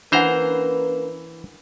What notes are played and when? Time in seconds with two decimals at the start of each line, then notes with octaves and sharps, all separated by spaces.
0.12 E3 A#3 C#4 D4 B4 C5 F#5 A#5